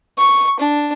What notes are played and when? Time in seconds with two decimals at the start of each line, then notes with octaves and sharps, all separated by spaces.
0.18 C#6
0.60 D4